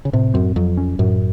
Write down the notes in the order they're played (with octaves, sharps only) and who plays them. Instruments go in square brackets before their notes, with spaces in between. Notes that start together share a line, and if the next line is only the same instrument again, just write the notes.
[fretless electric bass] C#3
[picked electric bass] A2 [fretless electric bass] C3
[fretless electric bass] F#2 [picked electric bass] C4
[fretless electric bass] F2 [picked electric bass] F#3
[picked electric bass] C#4
[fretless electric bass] F#2 [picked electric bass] A2